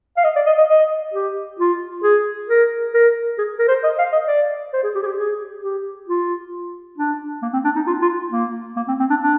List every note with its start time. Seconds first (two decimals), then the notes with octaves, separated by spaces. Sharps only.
0.17 F5
0.24 D#5
0.36 D5
0.47 D#5
0.58 D#5
0.70 D#5
1.14 G4
1.59 F4
2.03 G#4
2.49 A#4
2.94 A#4
3.38 G#4
3.59 A#4
3.68 C5
3.84 D#5
3.99 F5
4.12 D#5
4.27 D5
4.73 C5
4.84 G#4
4.95 G4
5.03 G#4
5.06 G4
5.18 G#4
5.63 G4
6.08 F4
6.98 D4
7.42 A#3
7.53 C4
7.64 D4
7.76 D#4
7.87 F4
8.02 F4
8.31 A#3
8.76 A#3
8.88 C4
8.99 C4
9.10 D4
9.22 D4